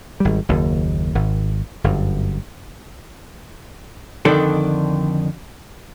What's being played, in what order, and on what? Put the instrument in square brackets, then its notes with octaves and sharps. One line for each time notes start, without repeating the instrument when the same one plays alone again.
[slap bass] G#1 G3
F#1 D#2
G#1
G1 F#2
[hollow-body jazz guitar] F2 D3 D#3 D4 A4